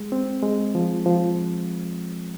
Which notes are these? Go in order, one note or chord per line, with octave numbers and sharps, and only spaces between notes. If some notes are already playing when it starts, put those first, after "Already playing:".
Already playing: G#3
C4
G#3
F3
F3